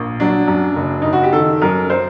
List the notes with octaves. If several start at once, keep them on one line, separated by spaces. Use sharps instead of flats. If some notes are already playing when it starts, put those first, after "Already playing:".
Already playing: A#1 A#3
F#3 D4
F#2
F#1
F#1 D#4
F#4
G4
D#3 A4
F#2 A#4
C5